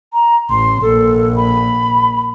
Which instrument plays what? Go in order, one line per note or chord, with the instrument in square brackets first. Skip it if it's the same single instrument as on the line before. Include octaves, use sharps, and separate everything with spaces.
[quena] A#5
[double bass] A1 [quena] C6
[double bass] A#1 [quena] A4
[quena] B5